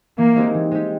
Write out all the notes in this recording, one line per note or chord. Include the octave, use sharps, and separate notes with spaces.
E3 A#3
G#3 C4 D#4 G4
E3
G#3 C4 D#4 G4